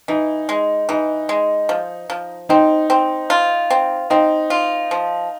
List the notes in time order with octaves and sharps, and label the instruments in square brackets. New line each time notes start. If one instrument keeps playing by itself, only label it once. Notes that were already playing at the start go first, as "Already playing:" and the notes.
[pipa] E3 [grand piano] D#4
[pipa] G#3
[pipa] E3 [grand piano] D#4
[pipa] G#3
F3
F3
[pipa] C4 [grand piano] D#4
[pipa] C4
F4
C4
[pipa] C4 [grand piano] D#4
[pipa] F4
F3